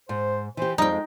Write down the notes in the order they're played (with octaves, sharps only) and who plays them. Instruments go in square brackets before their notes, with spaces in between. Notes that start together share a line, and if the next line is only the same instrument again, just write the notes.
[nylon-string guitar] G#2 [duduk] C5
[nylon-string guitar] E3 G4 [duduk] C5
[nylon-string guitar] F2 C4 [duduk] G3 [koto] D#4 G5
[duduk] G#3